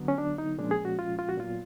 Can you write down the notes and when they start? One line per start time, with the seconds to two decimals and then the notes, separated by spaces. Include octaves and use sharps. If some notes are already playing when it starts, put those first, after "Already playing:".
Already playing: D3 F#3 B3
0.08 C#4
0.18 D4
0.38 D#4
0.58 A#2 F3 G#3 C#4 D4
0.71 G#4
0.85 F#4
0.99 F4
1.19 F4
1.29 F#4
1.38 A#2 F#3 B3 F4